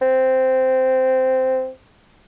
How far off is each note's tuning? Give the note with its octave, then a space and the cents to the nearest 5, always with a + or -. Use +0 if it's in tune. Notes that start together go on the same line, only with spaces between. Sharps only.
C4 -10